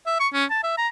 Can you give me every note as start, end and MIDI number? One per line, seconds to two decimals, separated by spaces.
0.07 0.17 76
0.20 0.28 85
0.33 0.45 61
0.51 0.61 81
0.63 0.74 76
0.78 0.88 82